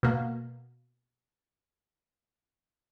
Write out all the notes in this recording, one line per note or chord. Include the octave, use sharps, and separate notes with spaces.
B2 A#3